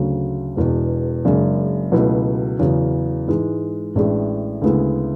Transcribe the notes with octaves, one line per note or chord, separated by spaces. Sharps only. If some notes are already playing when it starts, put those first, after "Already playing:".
Already playing: D2 C#3 F#3
E1 E2 B2
F#1 F#2 C#3 G#3 D4
C#2 B2 F#3 A3 E4
E2 C#3 F#3 C#4
G#2 E3 G#3
A1 A2 G#3 D4 G#4
D2 C#3 G#3 B3 E4